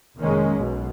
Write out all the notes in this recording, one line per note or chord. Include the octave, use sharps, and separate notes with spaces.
F1 D#3 G#3 A#3 C#4
B1 B2